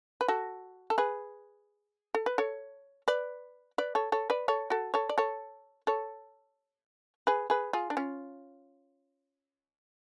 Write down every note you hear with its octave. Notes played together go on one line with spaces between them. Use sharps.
B4
F#4 A4
A4
G#4 B4
A4
B4
A4 C#5
B4 D5
B4 D5
A4 C#5
A4 C#5
B4 D5
A4 C#5
F#4 A4
A4 C#5
D5
A4 C#5
A4 C#5
G#4 B4
G#4 B4
F4 G#4
D4
C#4 F4